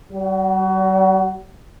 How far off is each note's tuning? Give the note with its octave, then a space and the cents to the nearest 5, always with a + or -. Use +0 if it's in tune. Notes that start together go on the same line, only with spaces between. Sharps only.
G3 -40 F#4 +25